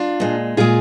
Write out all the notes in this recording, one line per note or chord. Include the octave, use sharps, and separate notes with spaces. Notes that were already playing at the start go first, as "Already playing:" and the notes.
Already playing: D4 F4
A#2 G#3
A#2 G#3 F4 G#4